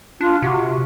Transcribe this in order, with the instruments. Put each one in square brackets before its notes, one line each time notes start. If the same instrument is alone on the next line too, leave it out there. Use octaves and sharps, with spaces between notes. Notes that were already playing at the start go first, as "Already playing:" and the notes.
[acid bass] D4 [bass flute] F4
[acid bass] C3 [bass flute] F#4